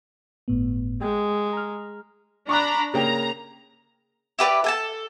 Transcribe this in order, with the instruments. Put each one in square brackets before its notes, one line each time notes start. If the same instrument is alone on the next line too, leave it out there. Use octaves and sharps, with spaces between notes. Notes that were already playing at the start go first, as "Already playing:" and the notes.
[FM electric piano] G1 A2 B3
[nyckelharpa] G#3 [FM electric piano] G5
[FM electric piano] A#5 F6
[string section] D4 A#5 B5 [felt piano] C#6 D6 F#6
[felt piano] C#3 A#3 G5 [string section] A#5
[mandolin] E4 G4 B4 D5
A4 G#5 A5